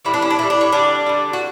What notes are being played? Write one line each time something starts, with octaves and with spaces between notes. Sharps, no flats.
A2 E3 G3 E4
D4
C#4
D4
A2 E3 G3 E4
D4
C#4
D3 G3 D4
D3 G3
F#4